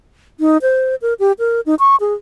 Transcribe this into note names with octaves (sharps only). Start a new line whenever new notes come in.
D#4
C5
A#4
G4
A#4
D#4
C#6
G#4